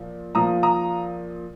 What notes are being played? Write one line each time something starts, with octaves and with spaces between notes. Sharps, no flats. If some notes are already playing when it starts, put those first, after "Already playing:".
Already playing: A#2 F3
A#2 F3 A#5 D#6
A#5 D#6